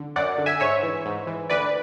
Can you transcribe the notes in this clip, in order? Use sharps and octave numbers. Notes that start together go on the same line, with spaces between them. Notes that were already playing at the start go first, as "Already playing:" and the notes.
Already playing: D3
F#2 D5 F#5
D3
E5 G#5
G#2 C#5 E5
E3
G#2
E3
D2 B4 D5